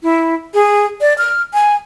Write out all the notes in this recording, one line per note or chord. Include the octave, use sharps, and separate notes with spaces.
E4
G#4
D5
F6
G#5